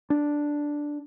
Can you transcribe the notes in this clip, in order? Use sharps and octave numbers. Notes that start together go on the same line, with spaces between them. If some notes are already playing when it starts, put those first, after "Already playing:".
D4